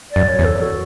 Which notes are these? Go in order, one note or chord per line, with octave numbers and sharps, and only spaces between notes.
D5
F#2
C#5
E2
A4
F#4